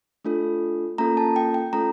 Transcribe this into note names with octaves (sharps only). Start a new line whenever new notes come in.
A3 D4 F4 A4
A#3 C#4 F4 A4 A#5
A5
G5
G5
A3 C#4 F4 A4 A#5